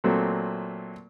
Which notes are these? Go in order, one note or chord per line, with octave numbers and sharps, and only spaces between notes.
A#2 F#3 A3 C4